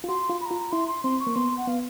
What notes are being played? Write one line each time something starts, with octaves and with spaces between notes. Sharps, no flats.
F4
F#4 C6
F4
B5
A#5
F4
E4 C6
C6
C4 C6
C#6
A#3
B3 C6
F#5
B3 F5